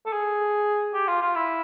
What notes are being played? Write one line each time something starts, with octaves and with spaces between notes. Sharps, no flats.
A4
G#4
G4
F4
F4
E4